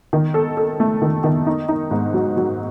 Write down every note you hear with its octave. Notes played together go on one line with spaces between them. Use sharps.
D#3
A4
A4
A3
D#3
D#3
D#4
D#4
G#2
F#3
F#3